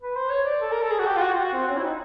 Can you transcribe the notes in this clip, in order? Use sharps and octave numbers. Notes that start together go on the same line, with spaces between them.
B4
C5
C#5
D5
A4
A#4
A4
G#4
F#4
G4
F4
F#4
F4
F#4
C4
C#4
E4
D#4